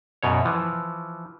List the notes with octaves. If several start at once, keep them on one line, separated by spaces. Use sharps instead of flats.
F#2 B2 C#5
E3 F3